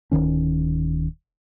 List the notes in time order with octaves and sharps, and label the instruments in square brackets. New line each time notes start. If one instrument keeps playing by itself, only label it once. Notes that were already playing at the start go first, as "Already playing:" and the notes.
[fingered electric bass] D1 E2 D#3 C#4